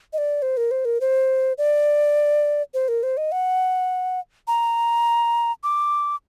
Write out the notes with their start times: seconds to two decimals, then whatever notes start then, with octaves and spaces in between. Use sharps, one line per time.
0.13 D#5
0.18 D5
0.42 C5
0.57 A#4
0.71 C5
0.85 A#4
1.01 C5
1.58 D5
2.74 C5
2.88 A#4
3.03 C5
3.17 D#5
3.32 F#5
4.48 A#5
5.64 D6